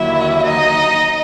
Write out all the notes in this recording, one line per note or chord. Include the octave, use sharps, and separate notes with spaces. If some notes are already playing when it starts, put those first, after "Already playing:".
Already playing: D#2 D3 F#3 E4 E5
D#4 D#5